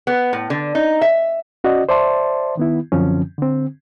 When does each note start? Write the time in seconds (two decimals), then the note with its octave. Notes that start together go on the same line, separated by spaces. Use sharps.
0.07 B3
0.33 A2
0.50 D3
0.75 D#4
1.02 E5
1.64 C#4 F#4 D5 D#5
1.89 C5 D5 E5 A5 C6
2.57 D#3 B3 E4
2.92 F#2 D3 F3 C4 C#4
3.38 D3 C4